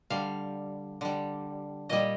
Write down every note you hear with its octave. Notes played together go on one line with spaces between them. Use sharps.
D3 G3 F5
D3 G3
A#2 G3 D#5